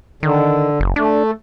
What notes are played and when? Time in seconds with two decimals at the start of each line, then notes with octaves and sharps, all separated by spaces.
0.23 D3 D#3
0.80 F#1
0.96 A3 D4